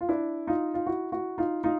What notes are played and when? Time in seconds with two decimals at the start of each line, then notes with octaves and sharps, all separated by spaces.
0.01 F4
0.09 D4 E4
0.47 D#4 F4
0.74 F4
0.86 E4 F#4
1.12 E4 F#4
1.38 D#4 F4
1.64 D#4 F4